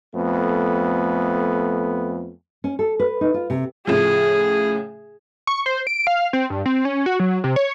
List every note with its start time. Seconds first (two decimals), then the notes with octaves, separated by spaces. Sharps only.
0.15 F2 A3 B3
2.64 C#4
2.79 A4
2.99 B4
3.21 D#4
3.34 F4
3.50 C3
3.87 A2 C#3 F3 G#4
5.47 C#6
5.66 C5
5.87 D7
6.07 F5
6.33 C4
6.50 G2
6.66 C4
6.85 C#4
7.06 F#4
7.20 F#3
7.44 C3
7.56 C#5